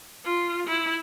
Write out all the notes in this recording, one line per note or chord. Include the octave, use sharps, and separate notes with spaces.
F4
E4